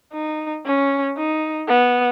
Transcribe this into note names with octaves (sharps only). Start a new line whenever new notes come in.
D#4
C#4
D#4
B3